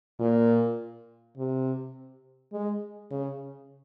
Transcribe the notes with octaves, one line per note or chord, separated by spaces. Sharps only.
A#2
C3
G#3
C#3